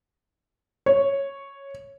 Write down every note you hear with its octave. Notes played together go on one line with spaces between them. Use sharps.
C#5